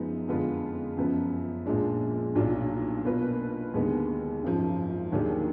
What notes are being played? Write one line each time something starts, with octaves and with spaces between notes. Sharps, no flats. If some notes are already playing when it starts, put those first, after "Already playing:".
Already playing: F#2 F3 G#3 B3 D#4
F2 D3 G#3 B3 F4
F#2 F3 B3
A#1 A#2 F3 G#3 D4
B1 A#2 F#3 D4 F4
B2 A#3 F4 B4
D#2 D3 G#3 B3
G#1 F#2 F3
D#2 D#3 F#3 D4 G#4